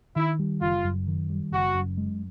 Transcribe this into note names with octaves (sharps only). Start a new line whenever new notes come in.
D#3 E4
G3
F#1 F4
F#2
D#3
G3
F#1 F#4
F#2
G#3